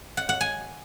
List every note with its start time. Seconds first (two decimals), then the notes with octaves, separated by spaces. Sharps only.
0.17 F#5
0.29 F#5
0.41 G#5